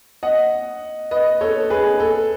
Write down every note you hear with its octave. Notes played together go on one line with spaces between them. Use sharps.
D#5 F#5
B4 D#5
A4 C#5
G#4 B4
A4